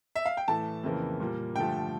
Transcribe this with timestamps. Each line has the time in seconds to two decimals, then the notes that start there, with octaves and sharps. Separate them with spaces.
0.15 E5
0.26 F5
0.37 G5
0.48 A2 E3 A3 A5
0.84 F2 C#3 E3 A#3
1.20 A#2 G3 A#3
1.55 G2 D3 F3 A3 G5